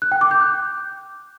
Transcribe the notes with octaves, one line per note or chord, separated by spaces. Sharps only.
F#6
G5
D6
G6
F#6